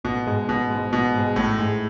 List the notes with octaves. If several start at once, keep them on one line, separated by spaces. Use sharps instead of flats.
A1 B2
G#2 G#3
A1 B2
G#2 G#3
A1 B2
G#2 G#3
A1 A2
G#2 G#3